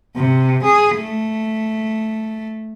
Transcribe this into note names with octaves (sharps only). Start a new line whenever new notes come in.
C3
G#4
A3